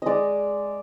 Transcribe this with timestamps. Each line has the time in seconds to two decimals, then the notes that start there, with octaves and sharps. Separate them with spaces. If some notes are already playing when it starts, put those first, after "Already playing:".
0.02 G#3 D5 D#5